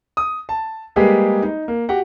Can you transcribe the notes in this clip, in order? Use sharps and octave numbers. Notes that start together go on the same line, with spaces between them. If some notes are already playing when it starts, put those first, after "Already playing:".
D#6
A5
G3 G#3 A#3 G4 G#4 B4
D#4
A#3
F#4 G4 F#5